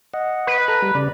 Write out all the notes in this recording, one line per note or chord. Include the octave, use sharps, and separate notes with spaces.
D#5 F#5
B4
A4 A#5
G3
C#3 D5